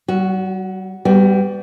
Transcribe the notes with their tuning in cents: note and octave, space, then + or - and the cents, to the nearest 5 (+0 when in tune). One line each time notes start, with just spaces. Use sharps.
G3 -45 F#4 +0
G3 +0 B3 +25 F#4 +35